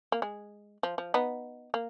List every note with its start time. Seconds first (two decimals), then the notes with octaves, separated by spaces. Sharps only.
0.12 A#3
0.22 G#3
0.83 F3
0.98 F3
1.14 B3 D#4
1.74 A#3